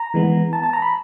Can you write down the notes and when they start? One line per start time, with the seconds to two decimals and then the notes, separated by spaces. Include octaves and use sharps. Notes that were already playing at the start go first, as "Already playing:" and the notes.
Already playing: A#5
0.14 E3 G#3 B3
0.53 A5
0.63 A5
0.73 A#5
0.82 B5